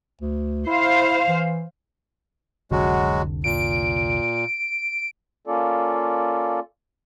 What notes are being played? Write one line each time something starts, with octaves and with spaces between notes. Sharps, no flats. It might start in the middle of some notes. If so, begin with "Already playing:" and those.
D2
E4 C5 F5
E3
F1 C2 D3 F#3 G#3 F#4
A#2 D7
A#3 C#4 F4 A4 D5